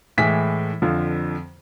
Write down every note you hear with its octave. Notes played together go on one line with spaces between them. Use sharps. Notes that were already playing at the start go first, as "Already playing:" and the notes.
A2 E3 G#3 B6
F2 D3 F3